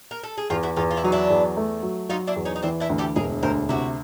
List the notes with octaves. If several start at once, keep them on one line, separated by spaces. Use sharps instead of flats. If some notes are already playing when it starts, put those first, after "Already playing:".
A#4
A4
G#4
E2 F4 G4
E4 F#4
E2 D#4 F4
F4
E4
F#3 D#4
D4 E4
E2
A3
F#3
F#3 D#4 F4
D4 E4
E2
C#4 D#4
D#4
E3 C4 D4
D4 E4
D2
G4 A4
E1 G#4 A#4
D2 A#4 C5
C3 E4 F#4